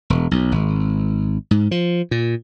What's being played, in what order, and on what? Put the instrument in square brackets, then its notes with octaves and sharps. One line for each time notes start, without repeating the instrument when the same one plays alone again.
[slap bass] E1
B1
G#1
G#2
F3
A#2